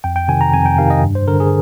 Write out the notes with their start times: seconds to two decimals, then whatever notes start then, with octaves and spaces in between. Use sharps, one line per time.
0.04 F2 G5
0.16 G5
0.28 C3 D#3 G#5
0.41 A#5
0.53 F2 G#5
0.66 G5
0.78 C3 D#3 F5
0.90 D#5
1.03 G2
1.15 C5
1.28 D3 A#4
1.40 G#4